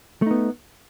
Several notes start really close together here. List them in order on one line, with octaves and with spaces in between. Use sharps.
A3 D#4 B3